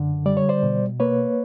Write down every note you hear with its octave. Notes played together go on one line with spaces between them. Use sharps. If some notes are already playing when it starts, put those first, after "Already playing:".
Already playing: F#2 D3
G3 D5
C#5
C5 D5
B2
A#3 B4 C#5